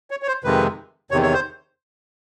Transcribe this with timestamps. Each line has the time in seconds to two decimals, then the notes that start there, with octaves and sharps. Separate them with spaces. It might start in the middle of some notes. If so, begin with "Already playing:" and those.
0.11 C#5
0.22 C#5
0.28 C5
0.44 F2 C3 D#3 G#3 B4
1.11 E2 C3 D#3 C#5
1.23 C#5
1.33 C5